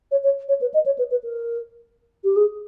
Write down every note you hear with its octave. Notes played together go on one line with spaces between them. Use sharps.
C#5
C#5
C#5
B4
D#5
C#5
B4
B4
A#4
G4
G#4